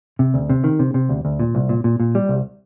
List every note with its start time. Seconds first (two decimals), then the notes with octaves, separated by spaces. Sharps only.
0.19 C3
0.34 D2
0.50 C3
0.64 D#3
0.79 C3
0.94 C3
1.09 D2
1.25 D2
1.40 A#2
1.55 C2
1.69 A#2
1.84 A#2
2.00 A#2
2.15 G3
2.29 C2